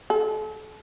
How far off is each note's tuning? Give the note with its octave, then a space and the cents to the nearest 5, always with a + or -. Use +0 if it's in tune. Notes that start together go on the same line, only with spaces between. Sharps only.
A4 -35